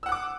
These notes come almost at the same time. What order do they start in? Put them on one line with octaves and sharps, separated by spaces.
E6 F#5 F#6 D6